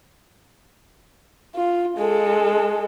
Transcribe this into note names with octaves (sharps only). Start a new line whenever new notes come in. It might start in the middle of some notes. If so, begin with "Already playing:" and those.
F4
G#3 A4